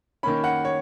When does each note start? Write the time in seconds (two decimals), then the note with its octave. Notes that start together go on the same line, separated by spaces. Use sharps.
0.23 D#3 A#3 C#4 B5
0.44 F#5
0.65 C#5